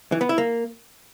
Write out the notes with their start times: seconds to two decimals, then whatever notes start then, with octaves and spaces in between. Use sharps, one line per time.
0.12 E3
0.21 B3
0.29 E4
0.38 A#3